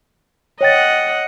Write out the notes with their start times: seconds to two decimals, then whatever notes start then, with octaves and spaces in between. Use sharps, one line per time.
0.61 C#5 D#5 F#5 G5 A6